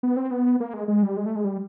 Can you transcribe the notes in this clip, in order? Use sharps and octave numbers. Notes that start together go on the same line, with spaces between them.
B3
C4
B3
A#3
G#3
G#3
G3
G#3
A3
G#3
G3